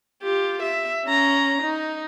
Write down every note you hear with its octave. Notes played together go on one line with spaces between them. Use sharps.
F4 G4
E5
C#4 A#5
D#4